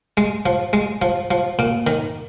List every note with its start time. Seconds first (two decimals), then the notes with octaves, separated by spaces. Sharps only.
0.17 G#3
0.46 F3
0.73 G#3
1.02 F3
1.31 F3
1.59 A#2
1.87 D#3